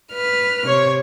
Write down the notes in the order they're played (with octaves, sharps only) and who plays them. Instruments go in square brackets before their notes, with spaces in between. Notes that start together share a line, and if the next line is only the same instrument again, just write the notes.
[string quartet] B4 F6
[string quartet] C3 [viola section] C#5